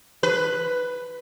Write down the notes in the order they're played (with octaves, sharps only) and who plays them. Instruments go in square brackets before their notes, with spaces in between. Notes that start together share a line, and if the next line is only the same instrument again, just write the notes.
[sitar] B4